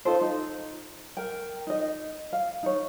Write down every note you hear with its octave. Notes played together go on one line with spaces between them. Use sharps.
D#4 F4 A4 C5
D#4
A#4 G5
D#4 D#5
F5
D#4 C#5